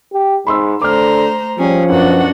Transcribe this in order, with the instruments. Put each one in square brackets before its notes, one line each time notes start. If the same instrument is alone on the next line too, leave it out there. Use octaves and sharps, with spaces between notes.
[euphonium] G4
[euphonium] G#2 [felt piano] B5 C6 E6
[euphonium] D3 [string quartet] A3 C5 A#5 [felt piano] D6 F6
[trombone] F3 [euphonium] G3 [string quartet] C#4 G#4
[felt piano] F#2 [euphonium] B2 [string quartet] D4 F#4 F#5